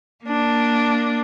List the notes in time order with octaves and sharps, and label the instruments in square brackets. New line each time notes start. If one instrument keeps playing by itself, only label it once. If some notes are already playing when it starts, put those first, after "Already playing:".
[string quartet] A#3 D4